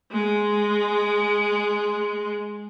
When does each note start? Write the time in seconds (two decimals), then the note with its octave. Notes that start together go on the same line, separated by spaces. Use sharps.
0.12 G#3